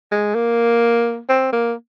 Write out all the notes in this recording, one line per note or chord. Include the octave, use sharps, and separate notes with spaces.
G#3
A#3
C4
A#3